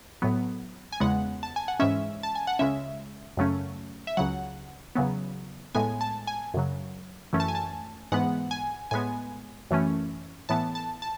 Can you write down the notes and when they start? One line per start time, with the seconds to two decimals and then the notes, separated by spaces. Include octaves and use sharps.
0.22 A2 F#3 B3
0.92 G#5
1.00 E2 C#3 G#3 B3 F#5
1.43 A5
1.56 G#5
1.68 F#5
1.79 G#2 E3 G#3 C#4 E5
2.23 A5
2.35 G#5
2.47 F#5
2.59 C#2 C#3 G#3 C#4 E5
3.37 F#2 C#3 F#3 A3 C#4
4.07 E5
4.17 C#2 C#3 F#3 F#5
4.95 E2 C#3 F#3 B3
5.75 A2 G#3 B3 G#5
6.01 A5
6.27 G#5
6.54 F#2 C#3 F#3
7.33 F#2 E3 A3 C#4
7.40 A5
7.48 G#5
7.55 A5
8.12 G#2 E3 G#3 B3 F#5
8.51 G#5
8.91 A2 G#3 B3 G#5
9.71 F#2 E3 A3 C#4
10.49 A2 E3 B3 A5
10.75 A5
11.02 A5